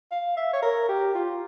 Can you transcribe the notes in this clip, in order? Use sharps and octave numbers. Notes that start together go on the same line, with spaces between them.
F5
E5
C#5
A#4
G4
F4